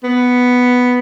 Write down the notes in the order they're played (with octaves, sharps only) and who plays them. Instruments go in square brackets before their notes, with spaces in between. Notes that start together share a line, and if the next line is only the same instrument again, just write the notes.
[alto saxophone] B3